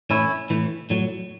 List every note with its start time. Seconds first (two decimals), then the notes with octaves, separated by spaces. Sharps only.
0.10 A2 E3 C#4 E4
0.50 A2 E3
0.90 A2 F#3